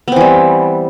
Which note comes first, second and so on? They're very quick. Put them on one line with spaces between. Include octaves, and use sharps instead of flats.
B3 C4 E3 G3